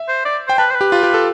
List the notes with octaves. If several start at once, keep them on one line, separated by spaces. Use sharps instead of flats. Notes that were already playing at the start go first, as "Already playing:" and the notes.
Already playing: E5
C5
D5
C5 G5
B4 A5
C5
B4
G4
F4
G4
A4